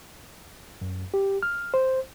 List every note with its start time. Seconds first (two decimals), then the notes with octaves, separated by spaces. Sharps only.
0.81 F#2
1.14 G4
1.43 F6
1.74 C5